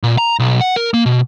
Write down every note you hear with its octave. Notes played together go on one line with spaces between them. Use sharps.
A#2
A#5
B1
F#5
A#4
A#3
B2